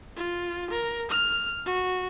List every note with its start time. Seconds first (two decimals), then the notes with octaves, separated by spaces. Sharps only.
0.16 F4
0.70 A#4
1.11 F6
1.66 F#4